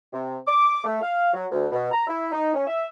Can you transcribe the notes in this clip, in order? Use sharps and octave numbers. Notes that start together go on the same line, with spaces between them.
C3
D6
A3
F5
F#3
D2
B2
A#5
E4
D#4
C#4
E5